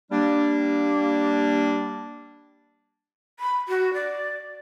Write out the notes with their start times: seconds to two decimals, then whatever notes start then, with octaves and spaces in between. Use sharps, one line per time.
0.11 G3 A#3 D4
3.40 B5
3.68 F#4
3.94 D5